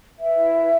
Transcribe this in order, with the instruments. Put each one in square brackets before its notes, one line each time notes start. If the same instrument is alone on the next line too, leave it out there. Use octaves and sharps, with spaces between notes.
[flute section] B4 E5
E4
B4